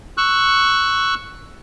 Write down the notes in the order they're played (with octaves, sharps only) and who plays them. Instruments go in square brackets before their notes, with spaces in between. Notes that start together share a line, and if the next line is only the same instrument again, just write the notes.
[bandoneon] C#6 E6 F#6